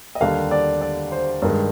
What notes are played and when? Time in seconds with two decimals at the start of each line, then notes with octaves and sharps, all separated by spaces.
0.15 D#5
0.21 D#2 D3 G3 F5
0.51 D5
0.81 D5
1.12 C5
1.42 G2 D#3 G#3